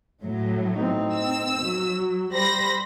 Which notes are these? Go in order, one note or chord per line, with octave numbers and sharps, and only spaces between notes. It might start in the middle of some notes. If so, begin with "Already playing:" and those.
A2 F#3
C4 D#4
E6
F#3
G3 C5 B5 A#6